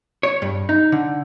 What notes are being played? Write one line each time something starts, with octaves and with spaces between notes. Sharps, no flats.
C#5
G2
D#4
D3